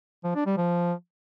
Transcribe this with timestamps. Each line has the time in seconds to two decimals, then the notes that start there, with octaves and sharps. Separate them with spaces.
0.24 F3
0.35 D4
0.46 G3
0.57 F3